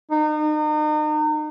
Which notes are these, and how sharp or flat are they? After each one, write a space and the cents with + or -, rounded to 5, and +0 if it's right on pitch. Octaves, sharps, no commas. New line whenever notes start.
D#4 -35